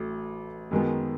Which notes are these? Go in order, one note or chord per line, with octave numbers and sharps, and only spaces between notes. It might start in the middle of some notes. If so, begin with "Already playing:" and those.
Already playing: A1 F#3 A3
F#2 D#3 G#3 B3